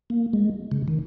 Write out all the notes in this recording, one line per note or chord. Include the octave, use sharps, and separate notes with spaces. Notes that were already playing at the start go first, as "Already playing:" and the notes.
A#3
G#3
C#3
D#3